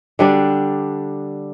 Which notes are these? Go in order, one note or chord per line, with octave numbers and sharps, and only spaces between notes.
D3 G3 D4